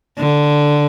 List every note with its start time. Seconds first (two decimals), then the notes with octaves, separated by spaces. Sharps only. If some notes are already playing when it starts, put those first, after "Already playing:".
0.18 D3